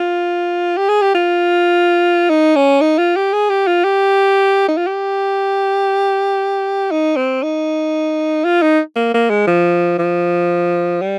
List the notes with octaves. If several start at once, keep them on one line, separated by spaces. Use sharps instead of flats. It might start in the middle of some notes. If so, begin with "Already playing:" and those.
Already playing: F4
G4
G#4
G4
F4
D#4
C#4
D#4
F4
G4
G#4
G4
F4
G4
D#4
F4
G4
D#4
C4
D#4
F4
D#4
A#3
A#3
G#3
F3
F3
G3